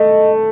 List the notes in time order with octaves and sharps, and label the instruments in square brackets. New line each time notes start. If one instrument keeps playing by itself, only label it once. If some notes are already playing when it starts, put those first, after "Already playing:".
Already playing: [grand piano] A3 [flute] D#5